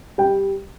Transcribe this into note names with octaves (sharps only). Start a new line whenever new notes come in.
G3 G5